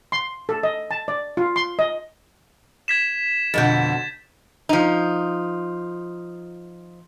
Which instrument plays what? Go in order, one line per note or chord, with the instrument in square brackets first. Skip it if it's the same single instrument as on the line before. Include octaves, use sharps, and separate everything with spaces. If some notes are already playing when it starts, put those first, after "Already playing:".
[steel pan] C6
A4
D#5
A5
D5
F4
C6
D#5
[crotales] G#6 B6 E7
[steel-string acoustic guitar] F2 B2 D3 [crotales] G6 A6
[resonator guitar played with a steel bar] F3 D#4